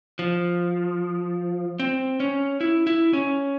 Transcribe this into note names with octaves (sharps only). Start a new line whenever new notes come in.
F3
C4
C#4
E4
E4
C#4